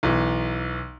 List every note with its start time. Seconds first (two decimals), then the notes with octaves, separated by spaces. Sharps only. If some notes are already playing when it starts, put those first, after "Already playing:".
0.03 B1 E3